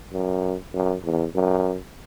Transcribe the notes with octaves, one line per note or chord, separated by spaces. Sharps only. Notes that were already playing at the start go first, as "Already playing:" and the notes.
F#2
F#2
E2
F#2